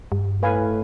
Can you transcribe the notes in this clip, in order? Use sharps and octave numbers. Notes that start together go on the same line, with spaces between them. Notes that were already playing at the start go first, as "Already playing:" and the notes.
G2
A2 B4 F5 G#5